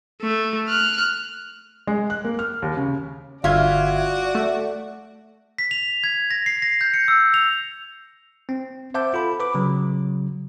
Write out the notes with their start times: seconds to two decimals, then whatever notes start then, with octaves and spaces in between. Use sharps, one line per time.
0.22 A3
0.68 F6 F#6
1.87 G#3
2.10 F#6
2.24 A#3
2.39 F6
2.62 D#2
2.77 C#3
3.44 G1 F4 F#4 D5 E5 G#6
4.35 A3
5.58 B6
5.71 F7
6.04 G#6
6.31 A#6
6.46 C7
6.62 A#6
6.81 G6
6.94 C#7
7.08 E6
7.34 F7
8.49 C4
8.94 C5 E5 F#5 A5 D6 G6
9.14 F4 A4 B5
9.40 B4 B5 D6
9.54 C#3 F#3